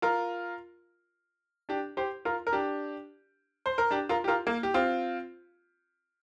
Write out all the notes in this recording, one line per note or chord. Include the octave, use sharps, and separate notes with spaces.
F4 A#4
D4 G4
G4 C5
F4 A#4
A#4
D4 G4
C5
A#4
D4 G4
F4 A#4
G4
F4 A#4
A#3
G4
C4 F4